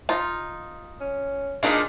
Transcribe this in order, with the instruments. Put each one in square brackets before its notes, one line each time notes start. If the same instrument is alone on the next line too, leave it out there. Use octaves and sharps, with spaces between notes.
[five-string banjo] D#4 F4
[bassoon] C#4
[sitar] A#2 D4 D#4 [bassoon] G#3 [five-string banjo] F5